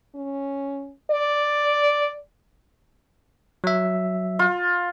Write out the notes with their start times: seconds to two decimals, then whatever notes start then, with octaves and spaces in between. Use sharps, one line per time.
0.15 C#4
1.11 D5
3.64 F#3 E5
4.39 F4